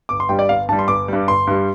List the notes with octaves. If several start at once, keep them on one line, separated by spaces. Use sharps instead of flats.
G1 D6
C6
G2 G3 G5
D5
G1 F5
G2 G3 A5
C6
G1 D6
G2 G3
G1 C6
G2 G3